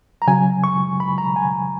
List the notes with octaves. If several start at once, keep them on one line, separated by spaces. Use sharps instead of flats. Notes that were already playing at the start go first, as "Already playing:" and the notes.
A#5
C#3 F#3 G#5
C#6
B5
A#5
G#5